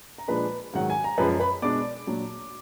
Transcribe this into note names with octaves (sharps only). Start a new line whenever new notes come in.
A#5
A#2 F3 G#3 D4 B4 B5
G#2 D#3 F#3 F#5
G#5
A#5
F#2 F3 G#3 B4 B5
B4 B5
B2 G#3 D4 D5 D6
A#2 F#3 D4